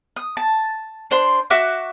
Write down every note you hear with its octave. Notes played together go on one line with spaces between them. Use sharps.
D#6
A5
D4 C5 C6
F#4 E5 D6 F#6